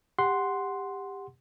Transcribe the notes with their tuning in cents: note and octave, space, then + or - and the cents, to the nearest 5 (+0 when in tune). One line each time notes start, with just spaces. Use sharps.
G4 +20 F#5 +0 C6 +0